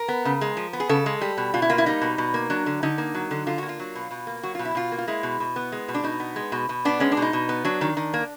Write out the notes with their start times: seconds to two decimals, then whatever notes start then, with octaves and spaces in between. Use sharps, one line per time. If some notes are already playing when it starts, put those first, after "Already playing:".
Already playing: A#4
0.08 B3
0.25 C#3
0.41 G#3
0.57 F3
0.73 B3
0.80 G#4
0.89 C#3 A4
1.06 G#3
1.21 G3
1.38 B2
1.54 B2 F4
1.62 E4
1.70 A#3 F4
1.78 E4
1.86 G3 D#4
2.02 B2
2.18 B2
2.34 A#3
2.50 F#3 D4
2.66 D3
2.83 D3 D#4
2.98 A#3
3.15 F#3
3.31 D3
3.47 D3 F4
3.58 A#3 F#4
3.69 F4
3.80 F#3
3.95 B2
4.11 B2
4.27 A#3
4.43 F#3 F#4
4.55 B2 F4
4.65 E4
4.75 B2 F4
4.92 A#3
4.98 F4
5.08 G#3 E4
5.23 B2
5.40 B2
5.56 B3
5.72 G#3
5.88 B2
5.94 D4
6.04 B2 D#4
6.20 B3
6.36 G#3
6.52 B2
6.69 B2
6.85 B3 D4
7.00 G#3 C#4
7.12 D4
7.17 B2
7.22 D#4
7.33 B2
7.49 B3
7.65 F#3 D4
7.81 D#3
7.97 D#3
8.14 A#3